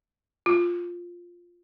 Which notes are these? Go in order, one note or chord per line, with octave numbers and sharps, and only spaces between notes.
F4